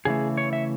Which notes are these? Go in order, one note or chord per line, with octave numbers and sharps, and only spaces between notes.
C#3 E3 A3 G#4
C#5
E5